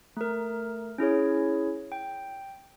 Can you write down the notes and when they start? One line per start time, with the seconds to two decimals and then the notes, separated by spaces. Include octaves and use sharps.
0.17 A3 A#4
0.98 C#4 E4 G#4 C#5
1.92 G5